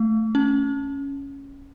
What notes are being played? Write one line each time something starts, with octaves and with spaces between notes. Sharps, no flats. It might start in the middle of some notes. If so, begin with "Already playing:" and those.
Already playing: A3
C#4